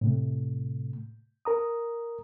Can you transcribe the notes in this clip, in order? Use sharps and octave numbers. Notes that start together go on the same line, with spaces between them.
A2 C3 A3
A#4 A#5 D#6